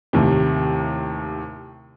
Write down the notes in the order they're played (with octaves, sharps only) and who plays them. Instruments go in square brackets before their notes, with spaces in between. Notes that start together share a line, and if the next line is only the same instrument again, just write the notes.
[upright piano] D#2 A2 C3